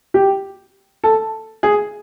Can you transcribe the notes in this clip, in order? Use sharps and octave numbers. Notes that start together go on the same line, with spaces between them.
G4
A4
G#4